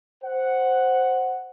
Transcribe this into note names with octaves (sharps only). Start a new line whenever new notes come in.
C5 F#5